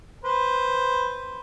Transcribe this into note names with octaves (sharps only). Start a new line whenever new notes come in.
B4 C5